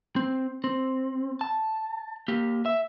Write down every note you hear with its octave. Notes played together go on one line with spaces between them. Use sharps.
C4
C4
A5
A#3 G4
E5